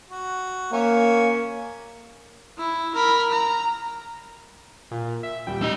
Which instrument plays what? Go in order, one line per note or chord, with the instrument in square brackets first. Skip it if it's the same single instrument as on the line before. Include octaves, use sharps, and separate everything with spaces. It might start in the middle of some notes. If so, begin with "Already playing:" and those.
[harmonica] F#4
[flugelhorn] A#3 [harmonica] C#4 E5
[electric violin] E4
A#4 B5
A#5
[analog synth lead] A#2
E5
[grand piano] D#1 G3 [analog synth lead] G5
[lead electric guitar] D4 D#5 [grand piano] E6 G7